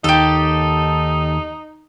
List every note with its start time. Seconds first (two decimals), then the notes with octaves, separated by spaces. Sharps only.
0.04 D#2 D#4 G4 A4